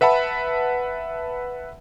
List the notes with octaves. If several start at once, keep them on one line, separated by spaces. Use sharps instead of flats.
B4 E5 F#5 A5 B5